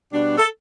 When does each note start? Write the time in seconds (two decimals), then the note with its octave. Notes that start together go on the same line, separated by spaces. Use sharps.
0.12 B2 G3 D4
0.38 A4